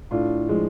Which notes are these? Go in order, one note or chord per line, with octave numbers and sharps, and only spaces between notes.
A2 D4 F4
F3 G#3